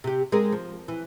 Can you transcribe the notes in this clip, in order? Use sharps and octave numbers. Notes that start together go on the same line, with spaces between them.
C3 G4
G#3 C4 A#4
F3
E3